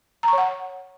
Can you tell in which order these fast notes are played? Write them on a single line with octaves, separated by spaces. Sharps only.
A#5 C#6 C#5 F#5